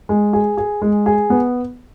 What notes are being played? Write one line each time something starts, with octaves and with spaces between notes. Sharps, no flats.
G#3
G#4
G#4
G#3
G#4
B3